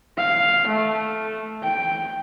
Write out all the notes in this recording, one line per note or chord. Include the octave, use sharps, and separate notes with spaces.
F5
A3
G5